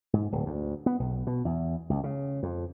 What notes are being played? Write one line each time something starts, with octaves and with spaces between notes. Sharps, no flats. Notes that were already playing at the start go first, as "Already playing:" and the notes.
G#2
D1
D2
B3
B1
B2
E2
C#2
C#3
F2